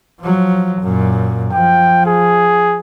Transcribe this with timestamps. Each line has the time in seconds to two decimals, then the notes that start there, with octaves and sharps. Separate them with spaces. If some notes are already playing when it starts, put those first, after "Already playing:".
0.21 F3 F#3
0.82 F#2 A#2
1.53 F3 G5
2.07 G#4